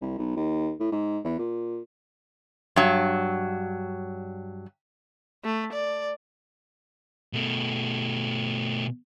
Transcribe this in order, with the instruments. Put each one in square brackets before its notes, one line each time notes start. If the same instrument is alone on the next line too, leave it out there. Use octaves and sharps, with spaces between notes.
[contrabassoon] C2
B1
D#2
A2
G#2
E2
A#2
[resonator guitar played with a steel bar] G2 F#3
[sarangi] A3
D5
[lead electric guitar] B2 A3